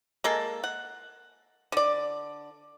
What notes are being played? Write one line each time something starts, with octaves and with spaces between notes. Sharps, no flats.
G#3 A#3 A4
F#5
D3 D5